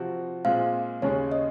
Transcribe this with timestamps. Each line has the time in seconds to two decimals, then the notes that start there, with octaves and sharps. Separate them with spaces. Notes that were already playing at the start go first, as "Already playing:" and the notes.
Already playing: C3 F3 C4 F#4
0.45 A#2 G#3 C4 F4 F5
1.02 D#2 C#3 G#3 C#4 G#4 C#5
1.32 D#5